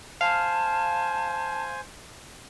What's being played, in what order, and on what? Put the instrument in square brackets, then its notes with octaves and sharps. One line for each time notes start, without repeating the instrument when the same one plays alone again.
[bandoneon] C5 G#5 [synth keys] F5 [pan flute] A5